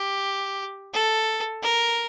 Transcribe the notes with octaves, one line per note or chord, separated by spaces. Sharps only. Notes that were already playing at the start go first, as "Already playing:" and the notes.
Already playing: G4
A4
A#4